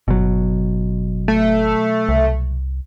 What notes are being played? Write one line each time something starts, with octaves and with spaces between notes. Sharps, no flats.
G1 B2 F#3
A3
C2